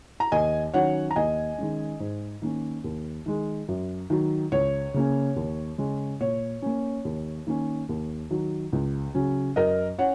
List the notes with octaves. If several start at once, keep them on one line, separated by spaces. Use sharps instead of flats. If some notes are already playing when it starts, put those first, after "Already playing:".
A#5
D#2 D#5 G#5
D#3 F#3 C#4 C#5 F#5
A#5
D#2 D#5 G#5
D#3 G#3 C#4
G#2
D#3 A#3 C#4
D#2
D#3 G#3
F#2
D#3 F#3
C#2 C#5
C#3 A#3 C#4
D#2
C#3 G#3 C#4
A#2 C#5
A#3 C#4
D#2
D#3 A#3 C#4
D#2
D#3 F#3
C#2
C#3 F#3 C#4
F#2 A#4 D#5
C#4 C#5 F#5